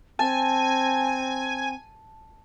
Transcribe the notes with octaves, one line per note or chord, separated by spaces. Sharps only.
C4 G#5 A5